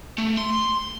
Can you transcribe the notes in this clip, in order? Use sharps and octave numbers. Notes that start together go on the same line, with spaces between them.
A3
C6